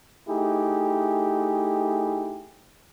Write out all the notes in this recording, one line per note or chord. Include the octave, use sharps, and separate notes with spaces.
A3 D#4 E4 G4 G#4